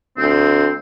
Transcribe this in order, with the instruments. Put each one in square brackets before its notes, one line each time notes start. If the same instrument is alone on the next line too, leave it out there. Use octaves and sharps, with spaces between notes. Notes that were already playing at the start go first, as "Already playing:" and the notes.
[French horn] D2 [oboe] C4